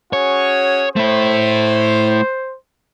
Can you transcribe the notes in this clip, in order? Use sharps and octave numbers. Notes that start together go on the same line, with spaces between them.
C#4 F#4 G#4 C#5
A3 E4 C5